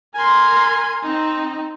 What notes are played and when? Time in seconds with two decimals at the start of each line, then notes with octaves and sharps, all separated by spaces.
0.15 A#4 G#5 C6
1.03 C4 D#4